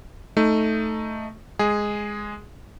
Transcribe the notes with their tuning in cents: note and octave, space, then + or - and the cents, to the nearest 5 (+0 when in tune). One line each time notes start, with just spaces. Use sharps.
A3 +0 D#4 +0
G#3 +0 G#4 +0